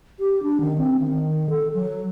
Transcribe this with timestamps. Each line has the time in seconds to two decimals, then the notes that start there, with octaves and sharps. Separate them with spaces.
0.20 G4
0.43 D4
0.61 D#3
0.78 C4
1.00 D#3
1.50 A4
1.74 F#3